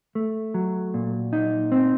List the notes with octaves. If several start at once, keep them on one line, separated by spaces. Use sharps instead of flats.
A3
F#3
A#2
D#4
C4